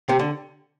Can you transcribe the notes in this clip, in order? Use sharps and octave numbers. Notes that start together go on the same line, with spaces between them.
C3
D3